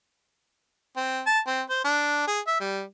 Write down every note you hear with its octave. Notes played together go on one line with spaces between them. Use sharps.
C4
A5
C4
C5
D4
G#4
E5
G3